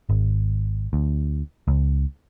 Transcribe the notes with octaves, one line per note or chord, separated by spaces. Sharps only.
G#1
D2
C#2